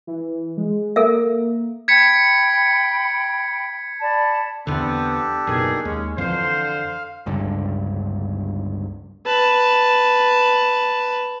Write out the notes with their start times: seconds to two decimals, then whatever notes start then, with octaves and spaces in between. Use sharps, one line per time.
0.07 E3
0.57 G#3
0.96 A#3 A4 A#4 E5
1.88 G5 B5 G#6 B6 C#7
4.01 D5 A5 B5
4.67 E2 D3 B3 C4 D4 G4 A4
5.47 F#1 B2 D#3 G#4
5.85 D#2 G#3 C#4
6.18 F2 D3 E3 C5 F5
7.26 G1 C#2 G2 D3
9.26 B4 A5